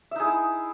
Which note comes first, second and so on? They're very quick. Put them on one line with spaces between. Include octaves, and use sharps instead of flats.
E5 D#4 G#4 E4